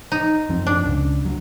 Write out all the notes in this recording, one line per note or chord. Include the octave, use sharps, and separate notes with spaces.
D#4
F#2 F3 C4
D4
C#2 C#3
D2 F#3